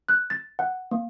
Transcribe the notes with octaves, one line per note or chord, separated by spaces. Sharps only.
F#6
A6
F#5
A#3